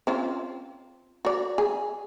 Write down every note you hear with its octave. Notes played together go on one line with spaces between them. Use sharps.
C4 C#4 F4
F#4 D5
G#4